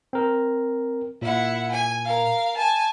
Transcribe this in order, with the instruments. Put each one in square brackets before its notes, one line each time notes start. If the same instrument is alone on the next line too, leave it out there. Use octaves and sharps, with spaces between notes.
[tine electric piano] C4 A#4
[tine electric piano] A#2 [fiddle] E4 F#5
[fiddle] G#5
A#4 F5
G#5 A5